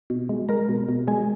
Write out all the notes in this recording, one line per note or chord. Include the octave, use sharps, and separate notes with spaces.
B2
G#3
G#3 A#4 A#5
B2
B2
G#3 G#4 G#5